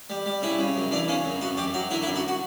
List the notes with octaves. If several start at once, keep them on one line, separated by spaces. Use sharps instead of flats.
G3
G3
C#3 E4
C#3
F#2
E3 D4
C#3 C#4
F#2
F#2 F#4
F#2 G4
F#3 F#4
D3 E4
E4
F#2
F#4
F#4